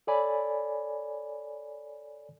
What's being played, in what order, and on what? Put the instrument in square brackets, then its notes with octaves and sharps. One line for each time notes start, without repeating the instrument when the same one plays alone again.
[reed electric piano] A4 C#5 D5 G#5 B5